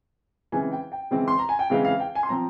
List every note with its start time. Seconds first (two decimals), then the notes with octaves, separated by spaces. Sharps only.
0.52 C#3 E3 G#3 C4 G#5
0.72 G5
0.92 G5
1.11 C#3 E3 G#3 C4
1.28 C6
1.39 A#5
1.49 G#5
1.59 G5
1.70 C#3 E3 G#3 C4 F5
1.85 F5
1.99 G5
2.15 G#5
2.23 C6
2.29 F3 C4 A#5